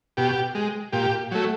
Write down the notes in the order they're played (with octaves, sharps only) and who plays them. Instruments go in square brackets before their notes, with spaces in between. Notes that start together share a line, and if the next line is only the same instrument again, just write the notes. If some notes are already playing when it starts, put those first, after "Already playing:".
[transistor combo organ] B2 G4
G#3
A#2 G4
F#3 A3